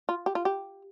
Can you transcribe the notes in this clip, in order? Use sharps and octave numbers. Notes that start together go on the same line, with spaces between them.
F4
G4
F4
G4